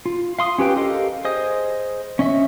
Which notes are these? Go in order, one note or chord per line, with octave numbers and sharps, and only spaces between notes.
F4
F5 C6 D#6
C#4 G4 B4 G5
G4 A4 A#4 D#5 F5
G#4 C5 D#5 D#6
C#4 D#5 E5